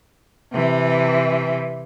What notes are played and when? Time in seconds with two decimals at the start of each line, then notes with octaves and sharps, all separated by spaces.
0.53 C3 E3